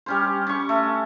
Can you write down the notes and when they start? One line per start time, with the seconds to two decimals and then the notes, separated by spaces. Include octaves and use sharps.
0.06 G3 C#4 C5
0.47 C#4 C#6
0.69 A3